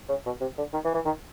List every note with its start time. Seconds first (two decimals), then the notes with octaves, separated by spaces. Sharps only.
0.09 C#3
0.26 B2
0.41 C3
0.58 D3
0.73 D#3
0.84 E3
0.95 E3
1.05 D#3